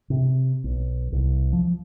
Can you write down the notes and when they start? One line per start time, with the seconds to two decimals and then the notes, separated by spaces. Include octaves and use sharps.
0.10 C3
0.64 B1
1.12 C2
1.53 F3